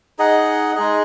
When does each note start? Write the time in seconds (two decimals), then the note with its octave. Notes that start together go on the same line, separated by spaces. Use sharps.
0.19 D#4 G#4 D#5 F#5
0.75 G#3 D#4 G#4 D#5